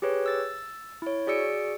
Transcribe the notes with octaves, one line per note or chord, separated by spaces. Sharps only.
G4 G#4 B4 C#5
E6 A6
E4 C#5
F#4 G#4 D5 E6 C#7 D7